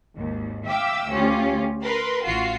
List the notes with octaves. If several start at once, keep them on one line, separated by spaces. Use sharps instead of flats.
G#1 D#2
E5 F5 G5 D6 E6
D2 C#4 F4 G4
A#4 B4 C6
A1 F4 F#4 C7